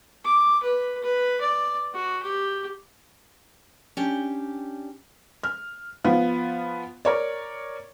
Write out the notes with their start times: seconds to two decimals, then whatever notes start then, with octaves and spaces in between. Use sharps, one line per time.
0.25 D6
0.63 B4
1.03 B4
1.41 D5
1.94 F#4
2.23 G4
3.97 C#4 D4 G4 G5
5.43 F6
6.04 F3 B3 F4
7.05 A#4 C#5 D5